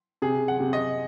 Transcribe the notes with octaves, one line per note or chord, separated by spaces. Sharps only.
C3 G#4
F#5
C3
D#5